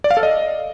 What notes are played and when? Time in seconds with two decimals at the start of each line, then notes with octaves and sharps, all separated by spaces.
0.04 D5
0.11 F5
0.17 A4
0.23 D#5